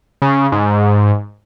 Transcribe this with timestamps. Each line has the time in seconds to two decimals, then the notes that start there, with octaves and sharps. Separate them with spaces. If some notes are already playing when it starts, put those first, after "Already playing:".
0.22 C#3
0.52 G#2